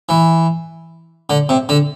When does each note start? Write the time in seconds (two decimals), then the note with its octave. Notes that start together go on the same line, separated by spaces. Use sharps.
0.09 E3
1.30 D3
1.49 C3
1.69 D3